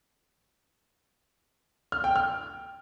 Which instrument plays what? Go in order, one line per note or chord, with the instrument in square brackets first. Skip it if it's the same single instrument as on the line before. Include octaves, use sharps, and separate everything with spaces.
[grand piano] F6
G5
F6